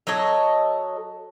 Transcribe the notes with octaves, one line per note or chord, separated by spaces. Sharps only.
F#3 A4 C#5 D#5